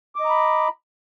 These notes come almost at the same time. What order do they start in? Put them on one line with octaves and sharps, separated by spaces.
D6 D#5 A#5 B5